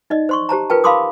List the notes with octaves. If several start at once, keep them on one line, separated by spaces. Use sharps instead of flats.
D#4 D5 D#5
C5 C6 C#6
G4 C5 A5 A#5
F4 A#4 B4 G5 A5
F5 A5 B5 C6 D6 D#6